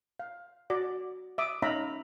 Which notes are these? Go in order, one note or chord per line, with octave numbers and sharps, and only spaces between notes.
F5
F#4 D5
E5 D6 D#6
C#4 D#4 E5 F5 A#5 B5